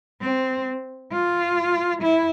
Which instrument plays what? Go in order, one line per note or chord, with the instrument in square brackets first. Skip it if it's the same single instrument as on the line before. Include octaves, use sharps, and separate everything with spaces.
[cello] C4
F4
E4